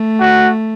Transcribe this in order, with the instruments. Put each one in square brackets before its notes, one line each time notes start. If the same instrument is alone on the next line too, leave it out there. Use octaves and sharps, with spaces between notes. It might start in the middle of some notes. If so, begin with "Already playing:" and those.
Already playing: [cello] A3
[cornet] F#4